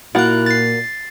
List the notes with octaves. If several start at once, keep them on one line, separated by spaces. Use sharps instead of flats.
A#2 A#3 E4 F#4 F#6
A6 C7